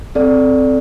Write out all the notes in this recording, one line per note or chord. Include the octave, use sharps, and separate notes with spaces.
C4 A4 D5